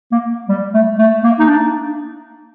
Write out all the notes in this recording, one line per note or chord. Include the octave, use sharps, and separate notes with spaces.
A#3
G3
A3
A3
A#3
D#4
D4